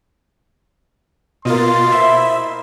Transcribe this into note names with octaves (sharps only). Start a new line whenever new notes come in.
B2 A#3 F4 D#5 C6 A6
E4 C5 E5